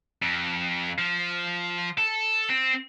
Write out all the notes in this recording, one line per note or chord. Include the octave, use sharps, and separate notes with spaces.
F2
F3
A4
C4